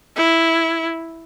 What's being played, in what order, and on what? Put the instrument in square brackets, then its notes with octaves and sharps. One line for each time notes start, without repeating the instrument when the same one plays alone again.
[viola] E4